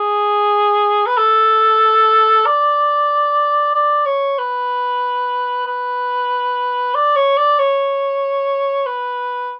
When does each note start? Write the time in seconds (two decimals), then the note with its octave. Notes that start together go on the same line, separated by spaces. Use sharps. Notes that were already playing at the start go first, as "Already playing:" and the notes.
Already playing: G#4
1.07 B4
1.18 A4
2.46 D5
3.75 D5
4.06 C#5
4.38 B4
5.66 B4
6.95 D5
7.16 C#5
7.37 D5
7.59 C#5
8.86 B4